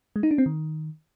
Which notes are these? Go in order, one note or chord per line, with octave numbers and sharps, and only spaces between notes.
G#3
D#4
D4
C4
D#3